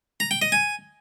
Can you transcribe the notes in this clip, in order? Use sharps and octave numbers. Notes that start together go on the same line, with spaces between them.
A#5
G5
D#5
G#5